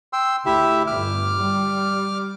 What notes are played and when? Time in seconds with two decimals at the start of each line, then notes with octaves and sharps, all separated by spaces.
0.13 G5 C6 E6
0.46 D2 E4 G4 E5
0.87 G1 D6 F6
1.39 G3